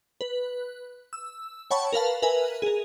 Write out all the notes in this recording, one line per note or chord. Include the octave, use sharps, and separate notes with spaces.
B4
E6
C#5 F#5 G5 A5 B5 C#6
A#4 B4 F5 A5
A#4 B4 E5 G#5
G#4 A#4